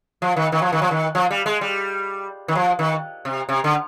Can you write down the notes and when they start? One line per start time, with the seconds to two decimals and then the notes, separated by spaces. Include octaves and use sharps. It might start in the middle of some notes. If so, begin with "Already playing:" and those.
0.22 F3
0.36 D#3
0.52 D#3
0.62 F3
0.72 D#3
0.82 F3
0.91 D#3
1.15 F3
1.31 G3
1.46 G#3
1.61 G3
2.48 D#3
2.55 F3
2.79 D#3
3.25 C3
3.49 C3
3.64 D3